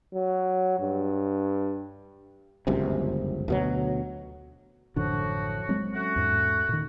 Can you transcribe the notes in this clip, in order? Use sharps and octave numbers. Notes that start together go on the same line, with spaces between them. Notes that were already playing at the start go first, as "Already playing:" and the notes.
F#3
G2
G1 C#2 F#2 C3
D2 B2 F#3
A1 F#2 A2 D3 F3 F#4
F#3 G#3 C4
A3 C#4 F#4
E2 G#2
A#2 D#3